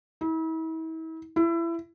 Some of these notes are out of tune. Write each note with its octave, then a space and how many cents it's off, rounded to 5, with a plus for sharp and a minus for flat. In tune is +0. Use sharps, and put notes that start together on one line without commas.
E4 -40
E4 +25